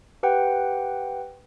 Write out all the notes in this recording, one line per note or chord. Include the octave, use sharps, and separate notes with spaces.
G4 B4 F#5 G5